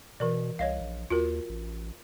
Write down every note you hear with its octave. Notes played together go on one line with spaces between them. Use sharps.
B2 E3 A#4 D5
C2 C#5 D#5 F5
A#1
D#2 F4 F#4 A#4
A1